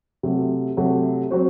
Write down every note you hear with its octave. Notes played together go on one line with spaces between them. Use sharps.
C3 F#3 A3
C3 F#3 A3
F#3 C4 F#4 C5